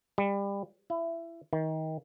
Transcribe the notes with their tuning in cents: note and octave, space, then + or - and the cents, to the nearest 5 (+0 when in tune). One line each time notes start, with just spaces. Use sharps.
G3 +25
E4 +20
D#3 +25